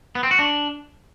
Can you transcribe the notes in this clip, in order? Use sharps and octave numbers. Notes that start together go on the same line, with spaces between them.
B3
C4
F#4
D4